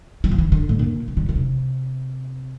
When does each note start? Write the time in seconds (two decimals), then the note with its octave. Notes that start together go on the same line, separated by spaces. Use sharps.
0.24 E3
0.31 F3
0.38 E3
0.52 D3
0.69 A2
0.79 A#2
1.08 C3
1.17 D3
1.29 D3
1.36 C3